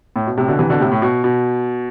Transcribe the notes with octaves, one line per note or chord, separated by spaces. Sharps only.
A2
B2
A2 C3
B2 D3
C3 E3
B2 D3
A2 C3
A2
B2
B2